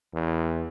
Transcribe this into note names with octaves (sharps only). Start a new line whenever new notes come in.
E2